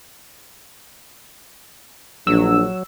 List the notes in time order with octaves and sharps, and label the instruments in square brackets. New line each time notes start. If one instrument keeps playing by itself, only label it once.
[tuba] A#1 [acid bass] F#3 [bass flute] D4 [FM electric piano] E6